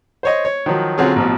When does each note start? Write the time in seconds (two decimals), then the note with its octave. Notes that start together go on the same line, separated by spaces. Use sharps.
0.23 C5 C#5 D#5
0.45 C#5
0.66 D#3 F3 F#3
0.98 D3 F#3 C4 C#4 F4 G#4
1.16 A1 B2 F3